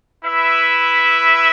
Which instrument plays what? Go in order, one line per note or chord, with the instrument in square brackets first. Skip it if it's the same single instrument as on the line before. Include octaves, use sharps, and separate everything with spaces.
[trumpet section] E4 B4 E5